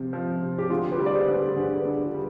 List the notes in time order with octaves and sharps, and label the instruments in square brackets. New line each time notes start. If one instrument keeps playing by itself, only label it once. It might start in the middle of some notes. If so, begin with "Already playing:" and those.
Already playing: [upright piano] C3 F3 C4
F3
C3
[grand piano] G4
[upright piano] D3 [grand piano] F4 G#4
[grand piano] G4 B4
[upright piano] G3
[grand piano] D5
G#4 C5
[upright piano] D3
[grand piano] G4 B4
[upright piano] D3 [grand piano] G#4
[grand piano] B4
G#4
B4
[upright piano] D3 [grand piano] G#4
[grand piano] B4
F4 G#4
[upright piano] G3